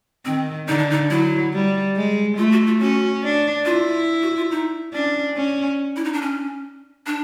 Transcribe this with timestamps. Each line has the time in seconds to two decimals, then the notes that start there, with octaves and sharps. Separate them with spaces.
0.25 D#3 C4
0.68 D3 D#4
0.78 D4
0.90 D#4
1.10 F#3 E4
1.53 G3
1.96 G#3
2.38 A3 F4
2.52 F#4
2.67 F4
2.80 C#4 F#4
3.24 D4
3.65 E4 F4
4.23 F#4
4.37 F4
4.51 D#4
4.93 C#4 D4
5.36 C#4
5.96 E4
6.05 D#4
6.13 D4
6.22 C#4
7.07 D4